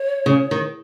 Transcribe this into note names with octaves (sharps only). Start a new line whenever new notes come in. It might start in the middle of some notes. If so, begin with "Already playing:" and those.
Already playing: C#5
C#3
D#3